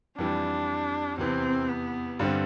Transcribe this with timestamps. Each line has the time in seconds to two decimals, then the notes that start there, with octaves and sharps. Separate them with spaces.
0.18 F2 E3 G3 D4
1.18 E2 C3 E3 C4
1.69 B3
2.19 G2 D3 G3 C4